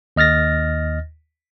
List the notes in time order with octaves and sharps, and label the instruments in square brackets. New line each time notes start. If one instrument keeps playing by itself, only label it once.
[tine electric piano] D#2 D#5 F6 A6 A#6